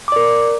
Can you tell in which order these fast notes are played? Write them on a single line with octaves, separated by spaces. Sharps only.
D6 D5 A#4